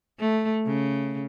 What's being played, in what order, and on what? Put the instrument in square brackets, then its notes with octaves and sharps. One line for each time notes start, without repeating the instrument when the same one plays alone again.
[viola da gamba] A3
C#3